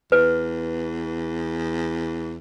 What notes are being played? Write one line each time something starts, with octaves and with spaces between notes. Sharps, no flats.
E2 B4